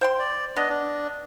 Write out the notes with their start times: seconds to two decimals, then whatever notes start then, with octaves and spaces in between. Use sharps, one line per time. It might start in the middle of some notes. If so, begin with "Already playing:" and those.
0.01 C5 G5 C6
0.19 D5
0.56 B3 D4 D#5
0.69 D4